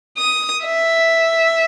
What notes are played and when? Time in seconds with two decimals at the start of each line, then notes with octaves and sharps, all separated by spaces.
0.18 D#6
0.66 E5